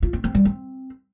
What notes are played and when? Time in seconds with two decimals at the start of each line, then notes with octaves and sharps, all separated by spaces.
0.03 F4
0.13 C4
0.24 C4
0.35 G3
0.45 C4